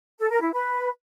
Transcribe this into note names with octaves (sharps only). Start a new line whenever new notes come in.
A4
A#4
E4
B4